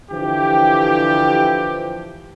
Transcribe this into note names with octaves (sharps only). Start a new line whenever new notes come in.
D3 E3 F3 G4